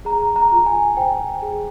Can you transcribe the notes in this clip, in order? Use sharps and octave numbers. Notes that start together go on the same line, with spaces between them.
G#4 A#5
A#5
F4
G#5
C5 G5
G#4